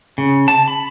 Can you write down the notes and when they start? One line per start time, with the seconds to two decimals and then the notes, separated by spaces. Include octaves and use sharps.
0.18 C#3
0.48 A5
0.68 B5